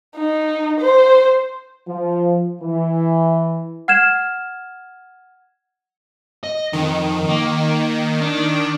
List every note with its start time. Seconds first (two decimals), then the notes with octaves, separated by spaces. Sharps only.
0.17 D#4
0.81 C5
1.88 F3
2.61 E3
3.88 F#5 F6 G#6 E7
6.44 D#5
6.73 F2 D#3
7.29 A#3
8.21 D4